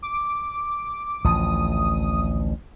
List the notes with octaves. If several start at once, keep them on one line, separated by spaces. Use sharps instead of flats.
D6
A1 D2 F3 D#6